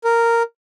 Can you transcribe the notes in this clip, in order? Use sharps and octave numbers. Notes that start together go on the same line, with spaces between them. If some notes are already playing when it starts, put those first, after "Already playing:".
A#4